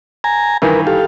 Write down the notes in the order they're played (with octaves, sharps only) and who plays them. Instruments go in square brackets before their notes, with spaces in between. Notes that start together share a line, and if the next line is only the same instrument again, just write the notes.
[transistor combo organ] G#5 A#5
[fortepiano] G2 D#3 E3 [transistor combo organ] A#4 B4
[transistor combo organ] G4 A4 F5